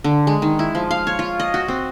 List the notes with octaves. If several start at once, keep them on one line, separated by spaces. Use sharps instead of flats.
D3
G#3
D#3
E4
F3
F5
C#5
F4
D#5
F#4
C4